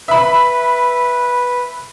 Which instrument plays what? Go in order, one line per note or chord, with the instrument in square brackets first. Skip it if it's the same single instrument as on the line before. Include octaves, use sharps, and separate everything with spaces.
[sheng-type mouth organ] B4 [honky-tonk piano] E5 B5